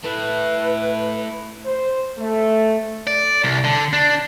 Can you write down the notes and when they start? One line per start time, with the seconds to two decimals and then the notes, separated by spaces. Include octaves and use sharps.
0.04 A3 E4 B4
1.65 C5
2.18 A3
3.07 D5
3.44 C2
3.64 D3
3.93 D4